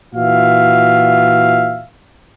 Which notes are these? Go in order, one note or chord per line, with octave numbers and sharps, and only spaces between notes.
A#2 E3 F#4 E5 F5